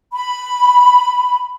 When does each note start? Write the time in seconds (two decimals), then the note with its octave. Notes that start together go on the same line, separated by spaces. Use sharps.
0.12 B5